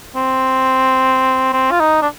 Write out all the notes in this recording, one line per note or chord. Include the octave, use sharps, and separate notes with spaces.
C4
C4
F4
D#4
D4